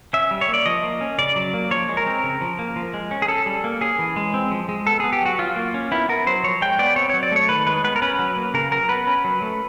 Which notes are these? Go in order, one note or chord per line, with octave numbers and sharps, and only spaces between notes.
C#4 E5
G3
C#5
A#3
D5
F3 D#5
A#3
C#4
C#3 D5
F#3
A#3
F3 C#5
G#3
A#4
C4
C#3
F3
A#3
F3
G#3
C#4
G#4
C#4 A4
G3
A#3
C#4 G#4
E3
G#3
C4
F3
G#3
B3 A4
B3 G#4
G4
F#3 F#4
F#3 F4
A#3
C#4
B3 E4
B3 A#4
F#3 C5
F3 C#5
G#3 G5
B3 D5
C4 C#5
F#3 C#5
D5
A3 C#5
D#3 B4
G#3 B4
B3 B4
A#4
C#4 B4
F#3
A#3
C#3 A#4
F#3 A#4
B3 B4
C#4
F#3
A3